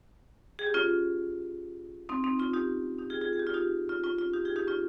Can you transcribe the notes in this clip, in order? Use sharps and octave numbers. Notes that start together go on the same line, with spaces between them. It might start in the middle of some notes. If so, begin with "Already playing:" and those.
G#4
G4
C#4 F4
C4 D#4
C4 D#4
C#4 F4
D#4 G4
D#4 G4
F4 G#4
F4 G#4
G#4
G4
F4
D#4 G4
C#4 F4
C#4 F4
C#4 F4
D#4 G4
F4 G#4
D#4 G4
C#4 F4